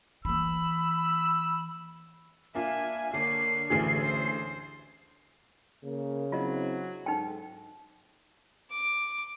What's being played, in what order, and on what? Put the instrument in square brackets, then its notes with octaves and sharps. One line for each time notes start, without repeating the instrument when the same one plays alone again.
[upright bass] E3 A#3 [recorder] B5 [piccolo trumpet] E6
[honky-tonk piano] A#3 D4 F4 [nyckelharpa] E5 [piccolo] G#5
[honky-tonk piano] D3 D4 [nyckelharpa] A#3 C#5 [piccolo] C7
[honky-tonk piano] A1 E3 G#4 [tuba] D2
[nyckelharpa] C5
[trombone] C#3 [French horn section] A#3 A#4
[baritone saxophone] F#3 [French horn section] C4 D4 E4 [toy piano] F4 D#5
[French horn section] G#2 A4 [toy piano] D#4 G5
[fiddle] D6